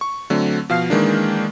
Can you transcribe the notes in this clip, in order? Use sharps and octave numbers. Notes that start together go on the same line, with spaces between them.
C#6
D3 F#3 A3 C4
B2 F3 F5 F6 C7
D#3 E3 G#3 A#3 D4